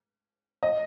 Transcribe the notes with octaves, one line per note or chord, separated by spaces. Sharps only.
D#5